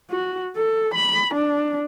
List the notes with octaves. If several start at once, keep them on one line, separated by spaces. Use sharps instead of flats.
F#4
A4
B5
D4